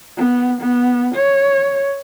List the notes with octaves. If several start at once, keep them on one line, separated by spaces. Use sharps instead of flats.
B3
B3
C#5